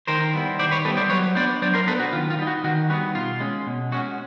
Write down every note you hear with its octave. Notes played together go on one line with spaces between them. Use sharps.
D#3 A#4 C5
G3 B3 E4
D#3 C5 D5
B4 C#5
G3 B3 E4 A4 B4
C5 D5
F#3 B4 C#5
B3 D4 C5 D5
F#3 C5 D5
A#4 C5
B3 D4 A4 B4
F#4
D#3 F4
F4
G3 B3 D#4
F#4
D#3 F#4
G3 B3 D#4 F#4
B2 F4
G#3 C#4
B2
G#3 C#4 F#4